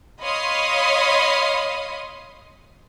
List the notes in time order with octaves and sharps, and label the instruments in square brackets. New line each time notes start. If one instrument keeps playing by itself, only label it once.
[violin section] C#5 D#5 F5 B5 C6 D#6